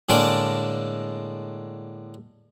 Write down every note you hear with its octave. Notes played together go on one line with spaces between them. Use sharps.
A2 D3 G#3 A#3 D5 A5